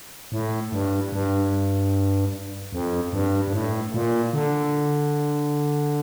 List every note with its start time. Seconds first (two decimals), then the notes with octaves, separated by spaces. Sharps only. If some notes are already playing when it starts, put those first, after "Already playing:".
0.32 A2
0.72 G2
1.12 G2
2.73 F2
3.13 G2
3.47 G2
3.53 A2
3.94 A#2
4.33 D3